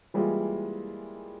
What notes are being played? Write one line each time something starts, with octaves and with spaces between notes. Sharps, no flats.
E3 G3 G#3 A#3 E4 F4